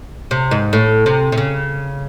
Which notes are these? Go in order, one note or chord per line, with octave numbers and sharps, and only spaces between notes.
C3
G#2
A2
C3
C3
C#3